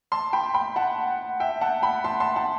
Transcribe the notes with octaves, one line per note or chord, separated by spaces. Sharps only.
A5 C6
G5 B5
G5 B5
F#5 A5
E5 G5
F#5 A5
G5 B5
A5 C6
A5 C6
F#5 A5